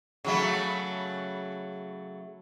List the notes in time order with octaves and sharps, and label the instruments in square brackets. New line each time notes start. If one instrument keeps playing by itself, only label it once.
[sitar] C#3 F#3 A3